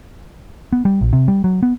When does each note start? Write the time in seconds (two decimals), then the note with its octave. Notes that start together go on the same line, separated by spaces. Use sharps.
0.72 B3
0.85 G3
1.01 A#1
1.13 C3
1.28 G3
1.44 F#3
1.63 B3